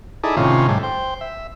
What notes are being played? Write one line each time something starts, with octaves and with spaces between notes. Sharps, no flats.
D#4 E4 G#4 A4 D5
A2 C3 D#3 C#4 F4
G#2 G3 A3
C5 G5
E5